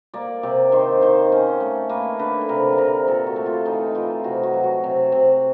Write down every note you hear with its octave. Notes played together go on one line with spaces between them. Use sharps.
A#3 D5
C3 D5
D#3 C5
D#3 C5
C#4
A3
A#3 B4
D3 B4
B4
C3 A#4
B4
C3 A#4
A#2 A4
F#4
A3
F4
E3 D#4
E3 F4
C3 F#4
F#4
F#3
F#4
C3
C3